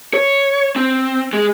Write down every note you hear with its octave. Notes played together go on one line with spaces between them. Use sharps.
C#5
C4
G#3 G#4